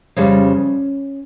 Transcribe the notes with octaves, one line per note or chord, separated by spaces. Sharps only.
F2 C#3 G3 C#4